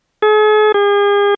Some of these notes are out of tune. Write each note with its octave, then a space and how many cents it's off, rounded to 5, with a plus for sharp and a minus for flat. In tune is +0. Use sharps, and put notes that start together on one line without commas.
G#4 +45
G#4 -40